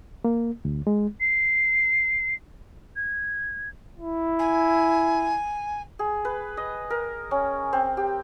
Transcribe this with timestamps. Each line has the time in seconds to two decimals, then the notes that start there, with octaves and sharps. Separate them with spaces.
0.25 A#3
0.65 D2
0.87 G#3
1.21 C7
2.96 G#6
3.99 E4
4.38 G#5
5.99 G#4
6.25 B4
6.57 D#5
6.90 A#4
7.31 C#4
7.73 C4
7.97 G4